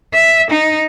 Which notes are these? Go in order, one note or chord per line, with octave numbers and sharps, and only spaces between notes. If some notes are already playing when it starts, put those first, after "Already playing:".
E5
D#4